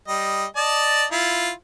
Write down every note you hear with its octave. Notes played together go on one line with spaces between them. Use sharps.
G3 D#5
D5 D#5 A5
E4 F4